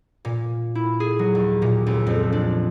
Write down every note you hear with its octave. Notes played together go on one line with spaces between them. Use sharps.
A#2
E4
G#4
F#3
D#2
A#2
C#2
F2
D4